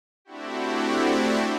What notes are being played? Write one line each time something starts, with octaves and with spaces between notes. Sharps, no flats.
A3 C4 D4 E4 F#4 G4